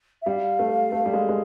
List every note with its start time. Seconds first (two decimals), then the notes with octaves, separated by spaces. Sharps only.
0.22 E5
0.26 G3 F5
0.59 A3
0.92 A3
1.06 G3
1.13 G#3
1.29 G#3